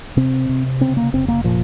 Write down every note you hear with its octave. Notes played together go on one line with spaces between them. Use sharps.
C3 C4
C3
C#3 C4
A#3
F1 C4
A#3
A#2 F3